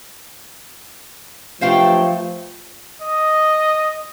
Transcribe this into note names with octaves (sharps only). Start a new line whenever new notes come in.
G2 F3 F#3 A3 C5 F5 G5
D#5